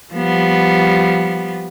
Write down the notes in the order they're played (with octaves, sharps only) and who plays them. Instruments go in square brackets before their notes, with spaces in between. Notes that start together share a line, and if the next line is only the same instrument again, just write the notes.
[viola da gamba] F3 G3 B3